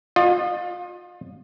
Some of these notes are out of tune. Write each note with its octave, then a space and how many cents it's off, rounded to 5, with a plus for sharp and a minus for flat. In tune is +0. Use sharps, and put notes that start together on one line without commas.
F4 +30 D#5 -25